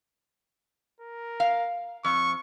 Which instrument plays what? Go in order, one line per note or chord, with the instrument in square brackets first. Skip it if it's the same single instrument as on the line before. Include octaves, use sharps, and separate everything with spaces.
[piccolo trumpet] A#4
[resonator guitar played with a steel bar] F5
[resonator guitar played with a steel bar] F2 [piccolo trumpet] C#6